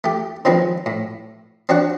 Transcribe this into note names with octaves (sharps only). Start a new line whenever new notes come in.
A3 G4
D#3 F3 F#3 G#3 B3 C4
A2
C4 D4 F#4 C#5 F#5